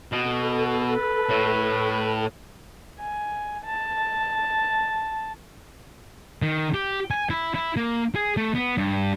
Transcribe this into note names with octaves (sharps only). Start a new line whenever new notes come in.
B2 A4
B4
A2
G#5
A5
D#3
G4
G#5
E4
E4
A#3
G#4
A3
B3
G2